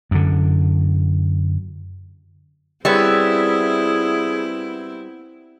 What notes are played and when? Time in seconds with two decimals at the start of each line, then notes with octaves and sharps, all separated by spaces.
0.11 F#2 D3
2.85 G3 B3 C4 E4 G#4 C#5 E5